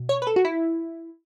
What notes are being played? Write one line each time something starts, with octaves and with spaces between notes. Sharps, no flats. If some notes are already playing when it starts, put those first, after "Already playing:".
Already playing: B2
C#5
B4
A4
F#4
E4